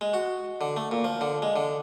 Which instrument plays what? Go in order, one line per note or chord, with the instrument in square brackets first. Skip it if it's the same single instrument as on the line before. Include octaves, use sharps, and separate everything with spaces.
[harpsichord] G#3
F#4
D3
A3
A#2
F3
D3
G#3
D3